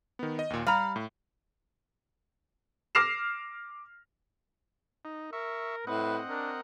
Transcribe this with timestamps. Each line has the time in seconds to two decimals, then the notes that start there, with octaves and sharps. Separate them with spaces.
0.19 D#3 B3
0.39 D#5
0.50 D#2 A#2
0.67 G3 F5 A#5 B5
0.96 A2
2.95 D6 F6 A#6 C7 E7
5.05 D#4
5.33 A#4 E5 C#6
5.87 A2 C4 B4 D#5 F#5
6.29 D4 A#4